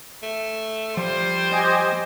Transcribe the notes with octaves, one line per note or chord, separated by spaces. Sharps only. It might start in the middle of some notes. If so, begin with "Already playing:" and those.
A3
F3 G3 C5
G4 D#5 G#5